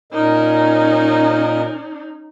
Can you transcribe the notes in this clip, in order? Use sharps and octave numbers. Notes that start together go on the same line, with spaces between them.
A#2 C#4 D#4 A#4 D#5